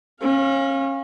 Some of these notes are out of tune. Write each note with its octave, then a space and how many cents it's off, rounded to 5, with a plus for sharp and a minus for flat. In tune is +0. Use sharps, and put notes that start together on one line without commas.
C#4 -30 F5 +0